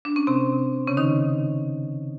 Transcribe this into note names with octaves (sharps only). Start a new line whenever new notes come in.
D4
C#4
C3 C4
C#3 C#4
D#3 D#4